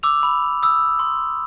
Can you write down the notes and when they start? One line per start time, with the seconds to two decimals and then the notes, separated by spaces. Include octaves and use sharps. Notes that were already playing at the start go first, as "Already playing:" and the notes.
0.03 D6 E6 F7
0.23 B5
0.63 D#6 E6
0.99 C6